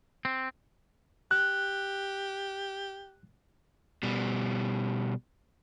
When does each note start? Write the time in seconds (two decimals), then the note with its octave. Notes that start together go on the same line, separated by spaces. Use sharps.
0.25 C4
1.31 G4 F#6
4.03 B2 G3